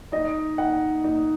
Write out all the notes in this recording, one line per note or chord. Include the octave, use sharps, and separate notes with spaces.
D#4 D#5
D#4 F#5
D#4